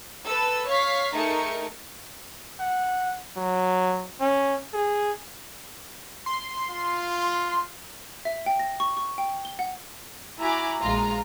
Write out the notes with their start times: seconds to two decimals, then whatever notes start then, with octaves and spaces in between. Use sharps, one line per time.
0.24 A4 B4 E6
0.67 C#5 F5 C#6 B6
1.13 A3 D#4 G#4 A#4 A#5 C#7
2.60 F#5
3.36 F#3
4.20 C#4
4.74 G#4
6.26 C6
6.70 F4
8.25 E5
8.46 G5
8.59 A#6
8.80 C#6
8.97 C#6
9.18 G5
9.45 G7
9.59 F#5
10.39 E4 F#4 G#5 A#5 B5 D6
10.82 A#1 G#3 F4 A#5